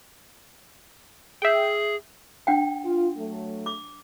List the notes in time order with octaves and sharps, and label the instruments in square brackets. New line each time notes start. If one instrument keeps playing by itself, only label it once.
[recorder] G#4 [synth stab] E5 G5
[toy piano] D4 F#5 G5
[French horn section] F4
F#3 A3
[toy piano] D6